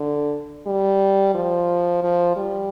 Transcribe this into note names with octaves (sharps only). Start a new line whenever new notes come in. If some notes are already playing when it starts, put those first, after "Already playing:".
Already playing: D3
G3
F3
F3
G3